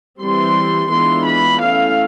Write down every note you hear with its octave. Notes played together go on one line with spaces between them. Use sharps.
E3 G3 C4 C6
E3 G#3 B3 D4 F4 C6
B5
A3 C#4 E4 F5